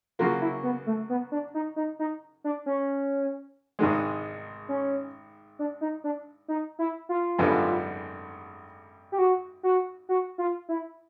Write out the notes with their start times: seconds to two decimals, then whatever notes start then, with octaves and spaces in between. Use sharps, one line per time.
0.19 C#3 F#3 A#3 F4
0.41 E4
0.63 B3
0.87 A3
1.09 B3
1.32 D4
1.54 D#4
1.76 D#4
1.99 D#4
2.44 D4
2.66 C#4
3.79 G#1 G#2 D#3 G#3
4.69 C#4
5.59 D4
5.81 D#4
6.04 D4
6.48 D#4
6.79 E4
7.09 F4
7.38 G#1 F#2 D3 G3 B3
9.12 G4
9.18 F#4
9.63 F#4
10.09 F#4
10.38 F4
10.69 E4